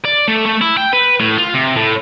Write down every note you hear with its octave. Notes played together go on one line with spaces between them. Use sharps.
D5
A3
A3
E4
G5
B4
A2
F4
C3
A2